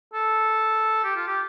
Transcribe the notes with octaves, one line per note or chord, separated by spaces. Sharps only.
A4
G4
F4
G4